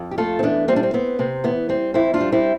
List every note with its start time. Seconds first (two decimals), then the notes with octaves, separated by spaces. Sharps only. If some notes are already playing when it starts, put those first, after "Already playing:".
Already playing: F2
0.11 G4
0.18 A3 F4 A4
0.39 C4
0.43 E2 B3 D4
0.68 G3 C4
0.76 D4
0.83 C4
0.94 B3 C4
1.19 C3 C4
1.44 E2 B3
1.69 G3 C4
1.94 F2 C4 E4
2.14 D4 F4
2.20 G3
2.32 C4 E4